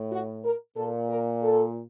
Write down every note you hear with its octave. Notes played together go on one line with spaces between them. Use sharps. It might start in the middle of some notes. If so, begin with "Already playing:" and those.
Already playing: A2
F#4
A#4
A#2 A4
A#4
A4